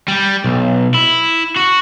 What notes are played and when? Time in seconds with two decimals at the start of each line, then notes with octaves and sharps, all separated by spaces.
0.08 G3
0.44 B1
0.95 E4
1.57 F#4